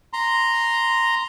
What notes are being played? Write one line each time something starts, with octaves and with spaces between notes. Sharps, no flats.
A#5 C6